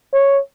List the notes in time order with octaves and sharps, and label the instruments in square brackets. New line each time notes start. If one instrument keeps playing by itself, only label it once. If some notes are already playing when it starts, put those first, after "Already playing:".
[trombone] C#5